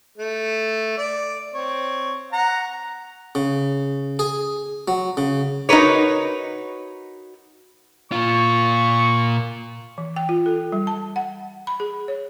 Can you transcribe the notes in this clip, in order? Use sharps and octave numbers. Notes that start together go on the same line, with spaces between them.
A3
D5
C4 C#5
F#5 A#5
C#3
G#4
F#3
C#3
D#4 F#4 A#4 B4 C#5
A#2 F4 C#6
E3
G5
F4
A4
G3
A5
F#5
B5
G#4
C#5